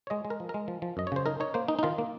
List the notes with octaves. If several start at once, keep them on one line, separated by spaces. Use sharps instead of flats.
C#5
G#3 D#5
G#3
A#4
F3
A#4
G#3
F3
F3
F#2 D#5
C#5
C#3 C5
D#4 A#4
D#4 C#5
A#3 C5
D#4
D#4
D#3 F4
A#3